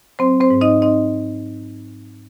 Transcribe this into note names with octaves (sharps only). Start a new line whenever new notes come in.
F#3 C4 C5
C4 C5
G#2
D#4 D#5
C4 D#4 D#5